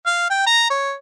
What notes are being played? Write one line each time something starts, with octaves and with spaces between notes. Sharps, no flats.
F5
G5
A#5
C#5